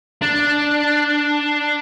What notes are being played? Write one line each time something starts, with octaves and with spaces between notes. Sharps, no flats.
D4